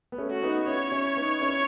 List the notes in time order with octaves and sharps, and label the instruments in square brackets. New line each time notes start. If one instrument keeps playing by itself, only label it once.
[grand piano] B3
A3 C#4
[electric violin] F#4
[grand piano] B3 D#4
[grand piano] C#4 E4 [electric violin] C#5
[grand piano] C#4 E4
B3 D#4
C#4 E4